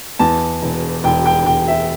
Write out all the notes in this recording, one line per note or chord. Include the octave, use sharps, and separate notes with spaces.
E2 A5
E1
E1 G5
G5
E1 G5
E5